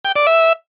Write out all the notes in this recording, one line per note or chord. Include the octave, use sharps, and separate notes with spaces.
G5
D5
E5